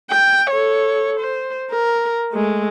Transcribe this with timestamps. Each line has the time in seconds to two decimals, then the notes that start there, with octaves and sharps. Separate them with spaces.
0.11 G5
0.50 A4 C#5
1.20 C5
1.71 A#4
2.33 G#3 A3